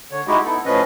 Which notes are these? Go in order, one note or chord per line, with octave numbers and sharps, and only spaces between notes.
D3 C#5
G#3 D#4 E4 F#4 G4
B3 D#4 E4 A4
A2 F3 C#4 B4 D#5